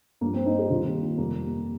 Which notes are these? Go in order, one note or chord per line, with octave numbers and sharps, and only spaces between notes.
G2 F3 A#3
C4
D#4
G4
D#2 D#3 G3 F4
F2 C3 G3 A#3